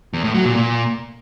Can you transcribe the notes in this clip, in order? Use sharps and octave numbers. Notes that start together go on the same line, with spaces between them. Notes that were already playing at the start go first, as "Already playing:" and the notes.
E2
A2
F#3
A#2
A#2